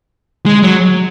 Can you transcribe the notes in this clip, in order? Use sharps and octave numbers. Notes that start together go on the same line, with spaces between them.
G#3
F#3